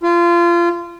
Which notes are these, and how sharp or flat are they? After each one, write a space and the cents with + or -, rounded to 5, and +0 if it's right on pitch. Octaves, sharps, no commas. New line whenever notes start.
F4 -25